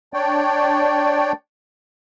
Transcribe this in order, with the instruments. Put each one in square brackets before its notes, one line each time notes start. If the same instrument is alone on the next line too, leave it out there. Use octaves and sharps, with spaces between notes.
[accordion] D4 C#5 D5 G5